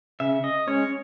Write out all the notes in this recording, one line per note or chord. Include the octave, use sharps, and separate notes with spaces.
C#3 E5
D#5
G#3 C#4 C#5